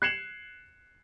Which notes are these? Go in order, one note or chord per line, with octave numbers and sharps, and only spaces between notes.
F#6 G#6 C7 C#7 E7 F#7